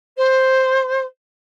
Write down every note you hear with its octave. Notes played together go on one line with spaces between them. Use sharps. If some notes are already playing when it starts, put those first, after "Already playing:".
C5